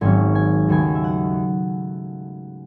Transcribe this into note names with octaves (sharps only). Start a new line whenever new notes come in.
G#1 G#2 D#3 F#3 C#4 G#5
G#5
D#2 C#3 F#3 A3 G#5
E5
F#5